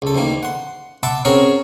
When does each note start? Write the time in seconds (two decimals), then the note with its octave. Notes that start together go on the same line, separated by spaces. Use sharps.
0.02 C#2 A4
0.15 D2 D#3 E3 A#3
0.43 F#5 C6
1.03 E5 F#5 A5 B5 C6 D6
1.25 C4 C#4 F#4 G#4 A#4 C#5